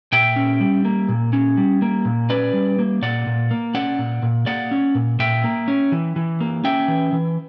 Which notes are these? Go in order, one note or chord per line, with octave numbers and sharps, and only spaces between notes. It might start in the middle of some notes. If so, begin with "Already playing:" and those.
A#2 E5 G5
C#4
G3
A#3
A#2
C#4
G3
A#3
A#2
C#4 B4 D5
G3
A#3
A#2 D5 F#5
A#2
A#3
C#4 D5 F#5
A#2
A#2
A#3 D5 F#5
C#4
A#2
A#2 E5 G5
A#3
C#4
E3
E3
A#3
C#4 E5 G5
E3
E3